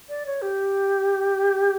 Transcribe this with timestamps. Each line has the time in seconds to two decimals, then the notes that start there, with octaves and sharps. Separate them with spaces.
0.09 D5
0.26 C#5
0.41 G4